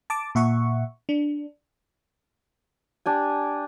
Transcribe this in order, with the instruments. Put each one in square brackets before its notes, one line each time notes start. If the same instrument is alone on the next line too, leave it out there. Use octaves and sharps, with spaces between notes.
[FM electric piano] A5 D6
A#2 E5 F#5 C#6
D4
[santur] D4 G4 G#5